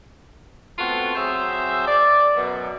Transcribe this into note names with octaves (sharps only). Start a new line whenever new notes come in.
A3 B3 C4 F4 F#4 A4
F#3 C4 G#4 C5 E5
D5
F#2 B2